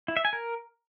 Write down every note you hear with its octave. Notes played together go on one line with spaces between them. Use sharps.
E4
E5
G#5
A#4